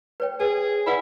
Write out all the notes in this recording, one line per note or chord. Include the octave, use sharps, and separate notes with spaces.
B4 C#5 G5
G#4 B4
E4 B4 D5 F#5